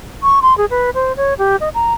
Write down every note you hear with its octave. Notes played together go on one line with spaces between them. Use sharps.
C#6
C6
G#4
B4
C5
C#5
G4
D#5
A#5